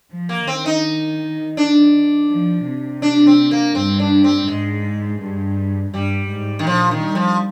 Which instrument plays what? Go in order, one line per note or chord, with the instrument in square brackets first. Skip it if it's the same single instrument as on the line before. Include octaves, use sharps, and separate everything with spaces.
[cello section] F3
[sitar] A#3
[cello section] D#3 [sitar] C4
[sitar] D#4
D4
[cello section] F3
C3
[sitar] D4
C4
A#3
[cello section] G2 [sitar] C4
[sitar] D4
C4
[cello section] G#2 [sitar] G#3
[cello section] G2
[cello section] G2 [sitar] G3
[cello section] G#2
[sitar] D#3
[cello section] A#2 [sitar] F3
[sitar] D#3
[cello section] G3
[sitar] F3